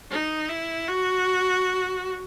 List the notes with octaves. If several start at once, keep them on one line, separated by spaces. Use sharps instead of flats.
D#4
E4
F#4